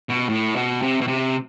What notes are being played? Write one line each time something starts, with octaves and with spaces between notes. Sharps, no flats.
B2
A2
B2
C3
B2
C3